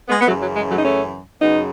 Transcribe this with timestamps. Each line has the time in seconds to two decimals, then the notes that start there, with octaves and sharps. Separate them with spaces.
0.08 G#3 B3
0.21 B3
0.27 F#2 C#3 E3 F#3 A3
0.42 F#3
0.56 G#3
0.70 F#3 A3
0.79 D#4
0.84 A3 C#4
1.41 F#2 C#3 F#3 B3 D#4